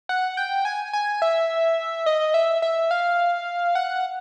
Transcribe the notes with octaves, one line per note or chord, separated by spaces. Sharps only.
F#5
G5
G#5
G#5
E5
D#5
E5
E5
F5
F#5